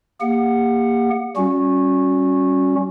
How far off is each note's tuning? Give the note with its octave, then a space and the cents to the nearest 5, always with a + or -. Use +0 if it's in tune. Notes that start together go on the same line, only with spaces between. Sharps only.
A#3 +0 G4 +35 F#5 +0
G3 -30 C#4 -5 F#4 -20